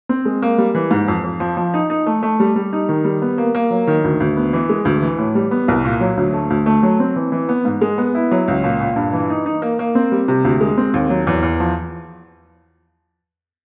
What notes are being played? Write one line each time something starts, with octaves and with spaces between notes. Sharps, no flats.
C4
G#3
A#3
G3
E3
G#2
F2
F2
F3
F3
D#4
D#4
A3
A3
G3
G3
D#4
D#3
G3
B3
A#3
A#3
F#3
D#3
D2
D2
B3
E3
G#3
D2
E3
A2
G3
B3
C2
A#2
F#3
D2
A3
D2
A3
F#3
C4
E3
E3
B3
G#2
G#3
B3
E4
F#3
C#2
A#2
A#2
G2
E3
D#4
D#4
A#3
A#3
C4
G3
C3
D2
G#3
C4
D#2
F#3
E2
E2
F3